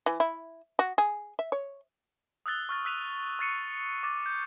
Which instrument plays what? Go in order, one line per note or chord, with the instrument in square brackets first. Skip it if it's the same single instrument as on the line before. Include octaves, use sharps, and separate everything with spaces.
[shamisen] E3
E4
F#4
G#4
E5
C#5
[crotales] D#6 E6 F#6 A6 G7
C#6 F6 A6
E6 F#6 B6 D#7 F7
C#6 F6 A6 C7 C#7 D#7
D6 A6
G6